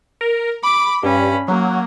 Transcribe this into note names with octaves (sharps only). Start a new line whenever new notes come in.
A#4
B5 D6
G2 C#4 B5
F#3 A#3